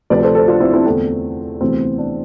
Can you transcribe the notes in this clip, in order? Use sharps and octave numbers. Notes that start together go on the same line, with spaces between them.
D2 C3 F3 B4 D5
A4 C5
A4 C5
D4 F4
C4 E4
C4 E4
E2 D3 A3 C4
D2 C3 E3 B3 C4
D4